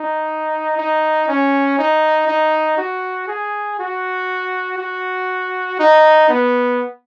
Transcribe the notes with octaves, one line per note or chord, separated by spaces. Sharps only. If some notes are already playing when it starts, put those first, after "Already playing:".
Already playing: D#4
D#4
C#4
D#4
D#4
F#4
G#4
F#4
F#4
D#4
B3